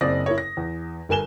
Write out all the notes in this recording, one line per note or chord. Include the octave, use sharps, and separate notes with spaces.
F#1 C4 D5 D#6 A#6
E4 A#4 C#5
A#6
E2
G1 A#4 G#5 E7 G7